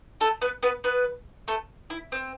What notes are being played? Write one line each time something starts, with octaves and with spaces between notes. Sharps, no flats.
A3 A4
B3 B4
B3 B4
B3 B4
A3 A4
E4
C4